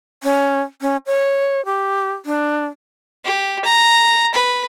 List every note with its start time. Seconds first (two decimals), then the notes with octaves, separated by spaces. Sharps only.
0.23 C#4
0.81 C#4
1.06 C#5
1.65 G4
2.26 D4
3.25 G4
3.64 A#5
4.34 B4